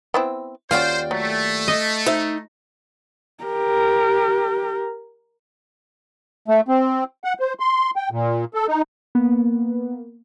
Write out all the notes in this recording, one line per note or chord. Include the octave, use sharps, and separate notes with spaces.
B3 C4 E4
D#2 C#4 F4 F#4 C5 D5 G5
F#3 A3
D#5
D#4 C5 E5
G4 A#4
A3
C4
F#5
C5
C6
G5
A#2
A4
D#4
A#3 B3